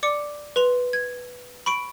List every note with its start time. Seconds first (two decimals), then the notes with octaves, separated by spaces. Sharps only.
0.03 D5 D6 C#7
0.56 B4 C6 F7
0.93 G#6
1.66 B5 C#6 D7